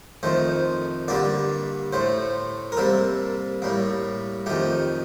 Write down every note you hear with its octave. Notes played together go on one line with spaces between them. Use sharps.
F2 D#3 A3 C5
G2 D3 G3 A#3 D5
A2 A3 C5
A#4
C3 G3 A#3 A4
A2 G3 A#3
F2 D#3 A3 G4